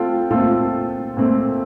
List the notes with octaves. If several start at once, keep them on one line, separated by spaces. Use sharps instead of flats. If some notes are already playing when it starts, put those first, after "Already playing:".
Already playing: A3 C4 F4 A4 G5
A#2 A3 C4 F4 A4
A#2 A3 C4